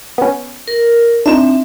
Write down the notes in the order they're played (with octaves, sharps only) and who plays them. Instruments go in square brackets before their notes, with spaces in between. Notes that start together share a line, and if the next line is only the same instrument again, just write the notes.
[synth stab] B3 C#4
[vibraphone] A#4
[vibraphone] C4 E5 [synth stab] D4 D#4